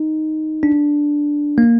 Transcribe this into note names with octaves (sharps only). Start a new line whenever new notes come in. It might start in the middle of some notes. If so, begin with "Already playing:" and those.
Already playing: D#4
D4
A#3